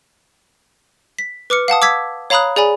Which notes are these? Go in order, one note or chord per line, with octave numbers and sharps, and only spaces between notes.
B6
B4 D6 F6 C#7
F5 F#5 A5 D#6
D6 E6 G#6 B6
C#5 F5 A#5 B5 D#6 F#6
G#4 D5 G#5 B5